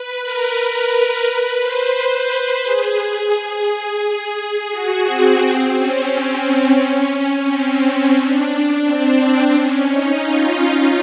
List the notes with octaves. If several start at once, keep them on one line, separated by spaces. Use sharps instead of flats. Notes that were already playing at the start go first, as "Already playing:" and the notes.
Already playing: B4
A#4
B4
C5
G#4
G#4
F#4
C4
C4
C#4
C#4
C4
C#4
D4
C4
C4
C#4
D#4
F4